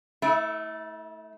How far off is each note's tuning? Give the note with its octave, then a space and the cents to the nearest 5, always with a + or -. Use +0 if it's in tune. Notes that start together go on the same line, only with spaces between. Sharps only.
A3 +0 E4 -40